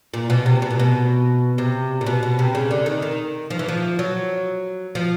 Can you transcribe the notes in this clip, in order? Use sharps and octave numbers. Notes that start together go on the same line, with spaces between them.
A#2
B2
C3
B2
A#2
B2
C3
A#2
B2
B2
C3
C#3
D3
D#3
D#3
F3
E3
F3
F#3
F3